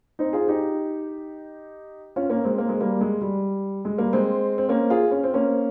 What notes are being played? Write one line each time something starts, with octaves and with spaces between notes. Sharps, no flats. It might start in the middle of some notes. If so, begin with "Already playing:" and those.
C4 D#4
F4 G#4
D#4 G4
C#4 F4
A#3 C#4
G#3 C4
A#3
G#3
G3 A#3
G#3
G3
G#3
G3 A#3
G#3 C4
C4
A#3 C#4
F4 G#4
C#4
C4
A#3 C#4